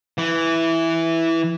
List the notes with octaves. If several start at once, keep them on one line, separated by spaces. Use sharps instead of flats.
E3